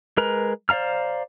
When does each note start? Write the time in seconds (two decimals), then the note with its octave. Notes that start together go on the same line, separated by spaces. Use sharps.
0.17 G#3 A#4 B4 A#5
0.69 C5 D5 F5 A#5 F6